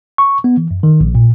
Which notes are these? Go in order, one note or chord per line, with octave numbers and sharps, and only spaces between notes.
C#6
B3
E3
F#2
D#3
A#1
A#2